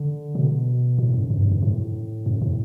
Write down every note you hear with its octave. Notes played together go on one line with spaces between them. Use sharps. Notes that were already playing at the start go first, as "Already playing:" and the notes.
Already playing: D3
B2
A2
F#2
G2
F#2
G2
A2
F#2
A2